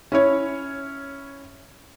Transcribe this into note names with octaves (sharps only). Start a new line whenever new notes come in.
C#4 E4 C#5